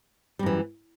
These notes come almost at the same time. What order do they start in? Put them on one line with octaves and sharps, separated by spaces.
G3 F#2 E3